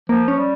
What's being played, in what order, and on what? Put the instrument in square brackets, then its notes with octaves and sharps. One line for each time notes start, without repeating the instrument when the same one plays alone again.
[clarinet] F3 [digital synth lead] A#3
[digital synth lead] C#4
[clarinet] G3